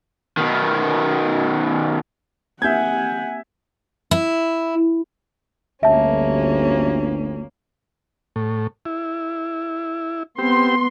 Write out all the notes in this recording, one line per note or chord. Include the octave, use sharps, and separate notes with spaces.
B2 D#3
A#3 C4 G4 E5 F#5 G#5 G6 G#6
E4
G1 D2 A#3 C#4 E5 A5
A2
E4
B3 C4 G4 C6